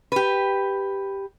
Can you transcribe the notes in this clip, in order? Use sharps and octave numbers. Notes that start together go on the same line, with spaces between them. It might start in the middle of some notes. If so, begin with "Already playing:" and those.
G4 B4